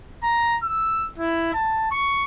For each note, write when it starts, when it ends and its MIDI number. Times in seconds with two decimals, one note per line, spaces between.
0.24 0.56 82
0.63 1.08 88
1.18 1.50 64
1.54 1.91 81
1.92 2.24 85